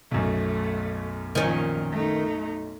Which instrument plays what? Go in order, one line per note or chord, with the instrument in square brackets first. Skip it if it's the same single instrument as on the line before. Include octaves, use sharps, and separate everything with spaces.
[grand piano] B1 F#2 [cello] A3
[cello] A#2 F3 [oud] D#3 C#4
[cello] A3 D#4